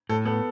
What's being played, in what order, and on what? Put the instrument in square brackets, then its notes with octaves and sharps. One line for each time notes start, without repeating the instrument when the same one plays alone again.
[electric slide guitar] A2 [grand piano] A4
[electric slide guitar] B3 [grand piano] A4